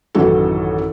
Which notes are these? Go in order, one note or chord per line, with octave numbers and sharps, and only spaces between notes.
A1 F#2 D#3 E3 F#4 A4